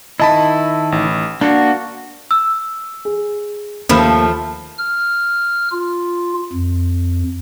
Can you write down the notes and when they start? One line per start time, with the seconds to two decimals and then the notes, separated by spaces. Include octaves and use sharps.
0.20 D#3 E4 D#5 A5 B5
0.92 A1
1.41 A#3 D4 F#4
2.31 E6
3.05 G#4
3.89 D#2 F3 A3 A#4 B5 F6
4.78 F6
5.72 F4
6.53 F2